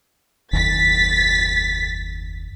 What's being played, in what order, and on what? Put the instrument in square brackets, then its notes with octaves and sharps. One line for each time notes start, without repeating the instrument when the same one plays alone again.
[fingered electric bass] F#1 D#2 [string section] A6 B6